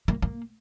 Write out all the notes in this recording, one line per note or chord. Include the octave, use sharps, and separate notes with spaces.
A#3
A#3